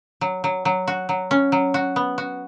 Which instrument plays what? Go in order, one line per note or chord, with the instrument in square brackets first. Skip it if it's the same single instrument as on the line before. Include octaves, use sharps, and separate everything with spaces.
[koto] F#3
F#3
F#3
F#4
F#3
C#4
F#3
F#4
B3
F#4